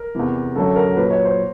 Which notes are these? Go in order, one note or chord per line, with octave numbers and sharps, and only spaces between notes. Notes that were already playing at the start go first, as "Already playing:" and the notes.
Already playing: A#4
E2 C3 E3
F#2 D3 F#3 A4
A#4
A#2 F#3 B4
C#5
C5